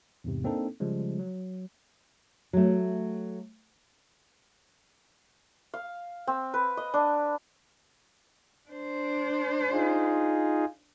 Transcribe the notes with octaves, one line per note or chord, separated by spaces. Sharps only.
E2 G#2 C3
A#3 C4 D4 D#4 A4
C#3 F3 G3 G#3
F#3
F#3 A3
F5
C4
B4
D#5
D4
D4 C5
D#4 F4 G#4